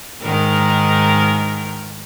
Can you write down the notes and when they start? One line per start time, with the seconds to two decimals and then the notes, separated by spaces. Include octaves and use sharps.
0.22 G#2 D#3 A#4